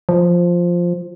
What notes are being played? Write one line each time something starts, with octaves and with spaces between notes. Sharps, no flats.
F3